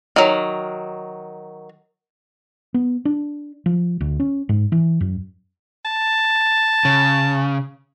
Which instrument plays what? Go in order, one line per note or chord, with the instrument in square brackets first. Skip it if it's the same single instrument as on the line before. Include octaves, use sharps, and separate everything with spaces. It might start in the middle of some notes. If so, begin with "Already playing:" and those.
[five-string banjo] D#3 F#3
[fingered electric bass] B3
D4
F3
D2
C#4
G#2
E3
F#2
[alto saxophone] A5
[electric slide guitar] C#3